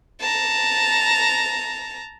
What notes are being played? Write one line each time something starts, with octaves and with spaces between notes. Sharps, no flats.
A5 A#5